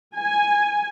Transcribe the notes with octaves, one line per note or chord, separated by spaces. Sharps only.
G#5